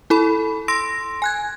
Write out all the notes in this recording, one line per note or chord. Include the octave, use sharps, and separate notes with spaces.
E4 A4 B5
C6 E6 A#6 D7
G#5 F#6 G#6